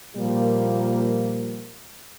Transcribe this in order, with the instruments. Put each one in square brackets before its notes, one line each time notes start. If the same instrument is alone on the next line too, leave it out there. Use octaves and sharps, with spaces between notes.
[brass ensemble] A#2 F3 G3 A#3